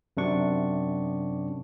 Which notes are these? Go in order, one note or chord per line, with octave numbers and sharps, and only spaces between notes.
F#2 C3 D4 C#6